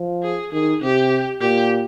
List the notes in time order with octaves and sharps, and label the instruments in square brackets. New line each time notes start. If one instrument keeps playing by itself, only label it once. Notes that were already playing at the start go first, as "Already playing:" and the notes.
Already playing: [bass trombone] F3
[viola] G#4
[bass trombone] D#3 [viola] G#4
[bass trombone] C3 [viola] G4
[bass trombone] A#2 [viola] G4